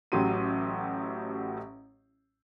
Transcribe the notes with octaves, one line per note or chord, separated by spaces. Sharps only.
A1 A2 F#3 G4 C6 D#7